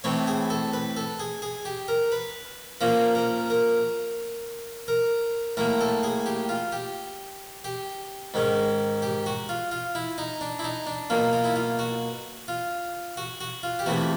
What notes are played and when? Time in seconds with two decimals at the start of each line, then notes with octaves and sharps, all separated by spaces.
0.04 A2 E3 A3 C4 C#5
0.27 G#4
0.50 A4
0.73 B4
0.97 A4
1.20 G#4
1.42 G#4
1.65 G4
1.88 A#4
2.12 B4
2.81 A#2 F3 A#3 C#4 A#4
3.15 A#4
3.50 A#4
4.88 A#4
5.57 A2 F#3 A#3 A#4
5.81 A4
6.04 G#4
6.26 G4
6.49 F4
6.72 G4
7.64 G4
8.34 G#2 D#3 G#3 C#4
9.02 G4
9.26 F#4
9.49 F4
9.72 F4
9.95 E4
10.18 D#4
10.41 D4
10.59 E4
10.64 D#4
10.87 D4
11.10 B2 F#3 A#3 F4
11.33 F4
11.44 E4
11.56 F4
11.79 F#4
12.48 F4
13.17 F#4
13.41 F#4
13.63 F4
13.79 G4
13.86 E2 C3 E3 A3 F#4